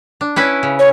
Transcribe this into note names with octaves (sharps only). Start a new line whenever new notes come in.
D4
C#4 E4 B4
C#3
C#5